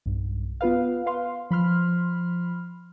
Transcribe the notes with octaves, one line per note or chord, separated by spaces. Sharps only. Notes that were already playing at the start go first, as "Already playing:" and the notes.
B1 G2
B3 F4 B4 F5
B4 F5 C6
F3 B5 C6 F6